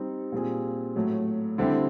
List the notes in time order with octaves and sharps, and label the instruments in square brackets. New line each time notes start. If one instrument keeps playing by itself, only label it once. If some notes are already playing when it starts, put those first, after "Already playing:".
Already playing: [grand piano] G3 C4 D#4
A#2 G3 C4 F4 G#4
A2 F#3 A3
D3 G3 C4 E4 G4